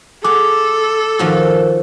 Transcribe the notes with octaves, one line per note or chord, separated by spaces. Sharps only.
G#4 A4 F#5 D6
D#3 F3 F#4